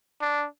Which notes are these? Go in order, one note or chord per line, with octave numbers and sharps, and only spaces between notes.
D4